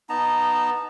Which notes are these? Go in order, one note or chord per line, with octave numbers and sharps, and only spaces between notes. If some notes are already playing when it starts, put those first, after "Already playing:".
B3 D#4 A5 A#5